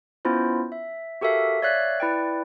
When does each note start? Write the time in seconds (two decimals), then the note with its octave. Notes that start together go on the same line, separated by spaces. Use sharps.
0.25 B3 C#4 E4 F4 C5
0.72 E5
1.21 F#4 G4 A4 A#4 E5 F5
1.62 C#5 D5 E5 F5 F#6 B6
2.00 E4 B4 D5 G5